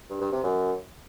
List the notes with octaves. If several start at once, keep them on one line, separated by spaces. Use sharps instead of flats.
G2
G2
C3
F#2